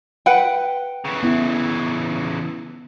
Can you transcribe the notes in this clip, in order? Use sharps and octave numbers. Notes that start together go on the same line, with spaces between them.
B4 F#5 G5
C#3 E3
B3 E4